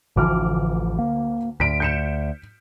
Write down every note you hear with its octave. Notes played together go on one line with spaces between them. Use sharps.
A1 D2 E3 F3 D6 F6
A#3
D2 B6 D7
G6 C#7 E7